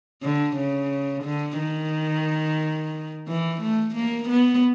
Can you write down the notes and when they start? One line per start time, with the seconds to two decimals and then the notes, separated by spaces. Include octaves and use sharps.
0.23 D3
0.56 C#3
1.24 D3
1.58 D#3
3.27 E3
3.61 A3
3.95 A#3
4.29 B3